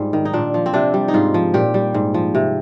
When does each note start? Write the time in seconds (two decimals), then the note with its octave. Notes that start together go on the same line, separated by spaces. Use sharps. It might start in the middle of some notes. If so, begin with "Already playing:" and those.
Already playing: G#2 G3 F4
0.13 D#3
0.25 D#4
0.33 A#2 D4
0.54 F3
0.66 C4
0.74 C3 D4
0.94 G3
1.08 D#4
1.14 G#2 F4
1.34 F3
1.54 A#2 G4
1.74 G3
1.94 G#2
2.14 F3
2.35 C3